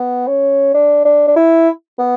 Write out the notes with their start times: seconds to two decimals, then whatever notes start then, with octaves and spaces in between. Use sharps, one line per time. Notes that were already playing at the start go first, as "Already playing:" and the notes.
Already playing: B3
0.27 C#4
0.74 D4
1.05 D4
1.27 D4
1.36 E4
1.98 B3